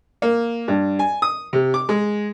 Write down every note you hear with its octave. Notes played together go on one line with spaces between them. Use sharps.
A#3
G2
G#5
D#6
C3
D6
G#3